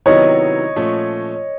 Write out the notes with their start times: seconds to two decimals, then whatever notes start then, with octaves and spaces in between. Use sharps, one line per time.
0.06 C3 D#3 F#3 B3 E4 C#5 D#5
0.76 A#2 F3 A3 C#4